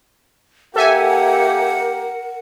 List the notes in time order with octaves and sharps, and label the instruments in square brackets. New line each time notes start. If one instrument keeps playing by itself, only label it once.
[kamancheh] A#3 G4 [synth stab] A4 E5 G#5 [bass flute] A#4 [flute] F#5